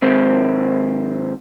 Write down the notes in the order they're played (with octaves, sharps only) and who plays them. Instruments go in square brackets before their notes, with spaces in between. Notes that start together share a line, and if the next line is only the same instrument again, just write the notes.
[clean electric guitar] D#2 G#2 C4